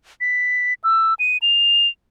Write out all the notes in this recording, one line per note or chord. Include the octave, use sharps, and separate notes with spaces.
B6
E6
D#7
F7